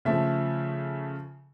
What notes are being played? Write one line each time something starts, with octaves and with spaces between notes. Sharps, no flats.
C#3 F3 A3 E5